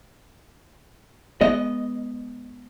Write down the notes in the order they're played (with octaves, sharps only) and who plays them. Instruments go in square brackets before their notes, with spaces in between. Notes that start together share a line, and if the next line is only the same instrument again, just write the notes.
[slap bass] G#3 B3 [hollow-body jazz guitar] D#5